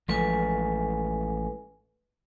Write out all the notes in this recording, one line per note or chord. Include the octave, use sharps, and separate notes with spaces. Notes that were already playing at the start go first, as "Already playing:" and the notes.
A1 F3 G#3 A4 B4 G#5